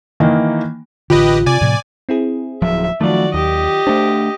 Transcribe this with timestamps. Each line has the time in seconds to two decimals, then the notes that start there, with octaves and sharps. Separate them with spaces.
0.20 D#3 E3 A#3 D#4
1.10 A1 D3 F4 G4 B4 D#5
1.46 C3 D5 G#5
1.61 A2 C3 F3
2.09 C4 E4 G#4
2.62 D1 F3 F#3 E5
3.01 D#3 F3 F#3 A3 F4 F#4 D5
3.34 D#2 G4 D#5
3.87 A3 D4 C5